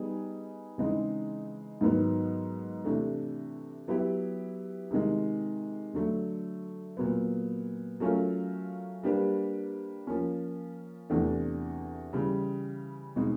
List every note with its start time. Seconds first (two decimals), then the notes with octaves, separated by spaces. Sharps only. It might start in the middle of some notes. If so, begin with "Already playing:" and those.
Already playing: G3 B3 D#4 G#4
0.78 C#3 E3 G#3 C4 D#4
1.81 G#2 D#3 F#3 B3
2.85 C3 E3 A3 D4
3.88 F#3 B3 E4 G4
4.91 C3 D#3 G#3
5.94 D3 F#3 A3
6.97 A#2 F#3 B3
8.00 F#3 A3 C#4 F4 A#4
9.03 G3 A#3 D4 G4 B4
10.07 F3 A#3 C#4
11.10 E2 C3 E3 A3 D4
12.13 C#3 E3 G3
13.16 B2 G#3 C4 D#4